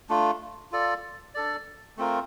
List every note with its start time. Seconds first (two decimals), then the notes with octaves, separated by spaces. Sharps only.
0.09 A3 D4 F4
0.72 F4 A4 D5
1.34 D4 A4 D5
1.97 A3 C4 F4 A#4